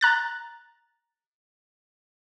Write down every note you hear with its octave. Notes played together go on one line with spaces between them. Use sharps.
A#5 F#6 A6